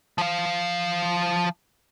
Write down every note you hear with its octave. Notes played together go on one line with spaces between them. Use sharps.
F3 F5